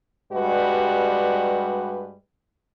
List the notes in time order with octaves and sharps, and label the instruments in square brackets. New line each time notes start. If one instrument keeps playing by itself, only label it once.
[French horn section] G2 G3 G#3 F#4 B4